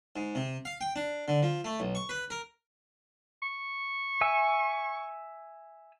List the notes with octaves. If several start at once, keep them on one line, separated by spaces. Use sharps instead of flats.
G#2
C3
F5
G5
D4
D3
F3
A3
B1
C#6
B4
A#4
C#6
E5 G#5 E6